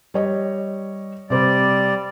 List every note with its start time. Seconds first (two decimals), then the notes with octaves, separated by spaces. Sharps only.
0.14 G3 C#5 D#5
1.30 C3 G3 C5 D5